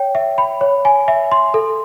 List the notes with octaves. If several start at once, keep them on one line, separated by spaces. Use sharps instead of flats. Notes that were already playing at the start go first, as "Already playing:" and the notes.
Already playing: C#5 G5
E5
B5
C#5
G#5
E5
C6
A4